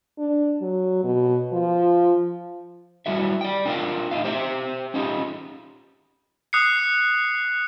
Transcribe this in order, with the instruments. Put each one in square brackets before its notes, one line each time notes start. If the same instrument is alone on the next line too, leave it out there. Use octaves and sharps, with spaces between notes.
[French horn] D4
F#3
B2
F3
[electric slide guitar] F#3 G3 E4 F#4 E5
D5 G5
D4 F4 A#4 D#5 F5 G5
A2 D#4 F5
G4 C5 E5 G5
C#4 D#4 F4 G4
[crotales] D#6 F#6 C7 C#7